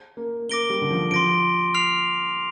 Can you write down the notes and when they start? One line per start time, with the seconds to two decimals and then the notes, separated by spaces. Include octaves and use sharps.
0.17 A#3
0.49 A#3 D6 A#6 D7 G7
0.70 G3
0.82 D3
0.91 F3
1.11 F3 C6 A#6 D7
1.74 F6 C7 F7